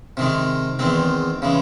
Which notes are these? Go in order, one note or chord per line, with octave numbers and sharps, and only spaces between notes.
C3 D#3 G#3
E2 D#3 G#3 C4
C#3 E3 G#3